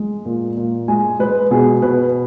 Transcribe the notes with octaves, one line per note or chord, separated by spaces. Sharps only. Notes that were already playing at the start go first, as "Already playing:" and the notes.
Already playing: G#3
A#2
A#2
G#3 G#5
G#3 B4
B2 G#4
B2 B4